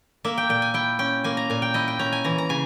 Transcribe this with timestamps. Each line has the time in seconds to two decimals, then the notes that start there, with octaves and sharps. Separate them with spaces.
0.25 A#3 E5
0.38 G5
0.49 A#2 G5
0.62 G#5
0.74 E4 G5
0.99 C#4 G5
1.24 A#3 G#5
1.37 A#5
1.50 A#2 G#5
1.62 G5
1.74 E4 D#5
1.88 G5
1.99 C#4 A#5
2.13 G#5
2.24 E3 A#5
2.38 A#5
2.49 C#3 G#5